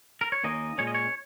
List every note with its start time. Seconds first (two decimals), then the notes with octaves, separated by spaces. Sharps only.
0.21 A#4
0.32 C#5
0.44 D#2 D#3 A#3 C#4 D#5
0.78 A#2 G#3 C#4 C#5
0.87 D#5
0.95 C#5